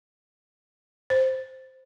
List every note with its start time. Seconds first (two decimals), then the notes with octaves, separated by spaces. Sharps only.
1.10 C5